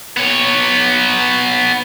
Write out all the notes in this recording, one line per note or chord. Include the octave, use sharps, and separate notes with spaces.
B3 C#5